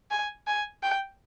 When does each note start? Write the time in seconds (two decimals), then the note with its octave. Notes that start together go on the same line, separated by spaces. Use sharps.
0.11 G#5
0.47 G#5
0.83 G5